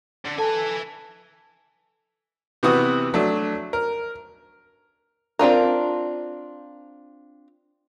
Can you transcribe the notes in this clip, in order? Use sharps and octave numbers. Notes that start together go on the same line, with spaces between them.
D3
A4 B4 G#5 A5
C3 E3 B3 F#4 D#6
F#3 A3 D4
A#4
C4 D4 F4 A#4